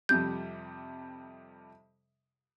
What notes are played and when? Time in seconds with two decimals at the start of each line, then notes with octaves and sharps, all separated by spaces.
0.09 F2 C3 G3 G6